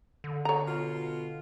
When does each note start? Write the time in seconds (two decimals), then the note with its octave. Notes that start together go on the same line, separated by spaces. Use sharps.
0.24 D3
0.45 C#5 A#5
0.66 B2 F4